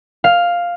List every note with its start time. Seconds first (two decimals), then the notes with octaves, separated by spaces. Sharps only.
0.24 F5